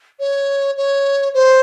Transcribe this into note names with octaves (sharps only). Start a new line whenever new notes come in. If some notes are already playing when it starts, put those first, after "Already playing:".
C#5
C#5
C5